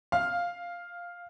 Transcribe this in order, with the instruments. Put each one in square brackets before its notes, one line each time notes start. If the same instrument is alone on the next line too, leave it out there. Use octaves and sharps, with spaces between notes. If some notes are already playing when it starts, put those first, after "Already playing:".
[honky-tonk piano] F5